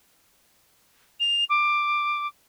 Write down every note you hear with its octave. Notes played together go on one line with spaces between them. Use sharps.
F7
D6